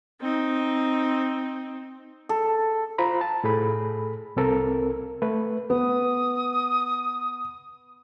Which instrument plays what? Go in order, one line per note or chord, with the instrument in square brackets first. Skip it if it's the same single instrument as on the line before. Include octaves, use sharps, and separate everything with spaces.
[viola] C4 D#4
[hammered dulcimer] A4
[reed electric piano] F4 C5 A#5 B5
A5
A2 G#4 A4 B5
C2 C4 A4 A#4
A3 B4
[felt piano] B3 [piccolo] D#6